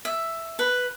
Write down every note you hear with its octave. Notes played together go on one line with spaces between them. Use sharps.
E5
B4